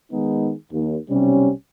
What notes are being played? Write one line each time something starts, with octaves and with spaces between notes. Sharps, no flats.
D#3 G#3 B3 D#4 G#4
D#2
B1 C3 G3 C#4